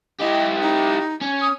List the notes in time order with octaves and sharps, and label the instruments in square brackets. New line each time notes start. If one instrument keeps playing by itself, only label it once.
[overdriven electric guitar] E4 G4 [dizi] D#5
[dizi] D#4
[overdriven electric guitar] C#4
[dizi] D#6